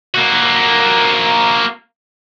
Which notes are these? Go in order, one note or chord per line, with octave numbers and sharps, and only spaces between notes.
A#3 F#4